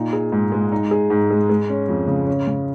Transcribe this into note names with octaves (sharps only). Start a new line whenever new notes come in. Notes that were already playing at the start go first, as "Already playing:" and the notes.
Already playing: A#2 D#4
G#4
G#2
G#3
D#4
G#4
G#2
G#3
G#3
C#4
F2
C#3
C#4
C#3